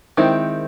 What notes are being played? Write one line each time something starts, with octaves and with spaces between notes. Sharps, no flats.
D#3 G#3 C4 E4